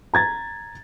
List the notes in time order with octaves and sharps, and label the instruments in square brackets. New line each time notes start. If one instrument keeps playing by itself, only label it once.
[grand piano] A#5 G#6 A6